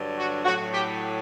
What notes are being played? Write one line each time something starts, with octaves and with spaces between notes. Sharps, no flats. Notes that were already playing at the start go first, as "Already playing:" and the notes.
Already playing: G2 D3 F#3
F#4
A2 F#3 F#4
G4